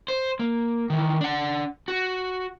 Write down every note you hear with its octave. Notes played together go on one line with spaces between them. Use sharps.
C5
A#3
D#3 E3
D4 F#5
F#4